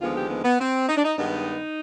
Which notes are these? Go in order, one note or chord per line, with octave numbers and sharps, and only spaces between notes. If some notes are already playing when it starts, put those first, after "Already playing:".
D#2 D3 F3 G#3 B3 F4
G4
B3
B3
C4
D#4
D4
D#4
G2 D#3 G#3 B3 D#4